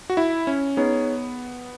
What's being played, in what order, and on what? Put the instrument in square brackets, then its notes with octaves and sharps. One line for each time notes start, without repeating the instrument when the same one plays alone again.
[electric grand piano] F#4
E4
C#4
[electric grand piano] B3 [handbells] D#4 G#4 C#5